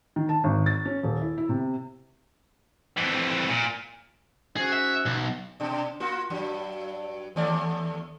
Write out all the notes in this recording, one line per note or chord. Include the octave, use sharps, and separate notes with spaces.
D#3
A5
G#1
A6
C#4
D#1
E4
E4
C3
F2 E3
A#2
G#2 C#4 F#4 G#4
E5
B1
B2 D4
A#3 F4 F#4
G2 F#3
D#2 A3 D5